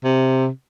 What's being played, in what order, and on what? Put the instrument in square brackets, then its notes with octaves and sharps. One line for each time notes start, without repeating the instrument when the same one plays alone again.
[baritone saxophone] C3